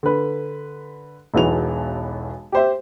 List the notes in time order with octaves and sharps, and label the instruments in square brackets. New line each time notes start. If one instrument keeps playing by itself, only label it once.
[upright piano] D3 B4
E1 B1 E3 F#4 F7
G4 C5 E5